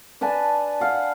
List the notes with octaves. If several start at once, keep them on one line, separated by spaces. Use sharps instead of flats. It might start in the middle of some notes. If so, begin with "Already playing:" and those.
D4 B4 G#5 A5
F5 F#5